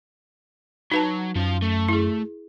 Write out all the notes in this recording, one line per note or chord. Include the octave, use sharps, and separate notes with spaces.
F#3 D#4 B4 A5
F#2 F3 F5
A3
E4 G#4